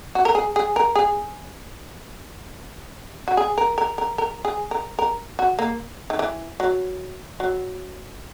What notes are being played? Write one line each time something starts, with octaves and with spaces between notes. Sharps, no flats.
F#4
A#4
G#4
G#4
A#4
G#4
F#4
G#4
A#4
A#4
A#4
A#4
G#4
A#4
A#4
F#4
A#3
D#3
E3
F#3
F#3